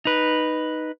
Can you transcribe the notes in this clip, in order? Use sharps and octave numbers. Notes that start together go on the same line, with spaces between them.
D#4 B4